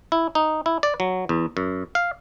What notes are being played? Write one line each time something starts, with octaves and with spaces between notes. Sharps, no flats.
E4
D#4
E4
D5
F#3
E2
F#2
F5